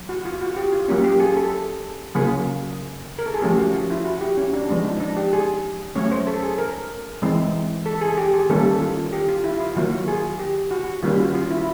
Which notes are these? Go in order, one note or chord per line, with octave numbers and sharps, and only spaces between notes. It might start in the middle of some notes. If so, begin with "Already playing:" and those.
Already playing: F#3
F#4
F4
F#4
G4
F4
F#3 A#3 C#4 G4
G4
G#4
A4
C#3 F#3 A#3 G#4
A#4
A4
G#4
F3 A3 C#4 G4
F#4
F4
E4
F#4
G4
C#4
D4
F3 G#3 B3 D4
D#4
D4
G4
G#4
F#3 A3 C#4 C#5
C5
A4
G#4
A#4
E3 G#3 C4
A4
G#4
G4
G#4
D#3 G3 A#3 C#4 A4
A4
F4
F4
G4
F4
E4
F4
D#3 F#3 A#3 F#4
G#4
G4
F#4
D#3 G3 A#3 C#4 F4
F#4
F4
E4